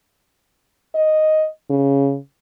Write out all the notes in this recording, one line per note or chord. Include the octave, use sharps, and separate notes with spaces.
D#5
C#3